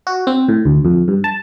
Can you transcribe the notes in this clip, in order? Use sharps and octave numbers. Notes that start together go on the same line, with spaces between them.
F#4
C4
A2
D2
F2
G2
A5